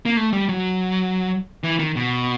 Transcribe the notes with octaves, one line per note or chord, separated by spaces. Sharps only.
A#3
A3
G3
F#3
E3
D#3
B2